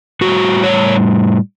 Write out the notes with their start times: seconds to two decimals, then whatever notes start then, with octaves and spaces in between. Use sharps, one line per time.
0.21 A2 G3 F#4
0.64 C#5